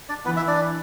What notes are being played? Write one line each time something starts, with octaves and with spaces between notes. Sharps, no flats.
D4 D5
E3 B3 B4
E4 E5
D4 D5